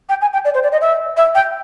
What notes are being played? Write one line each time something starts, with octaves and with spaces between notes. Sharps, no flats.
G5
G#5
G5
D5
C5
D5
D#5
E5
E5
G5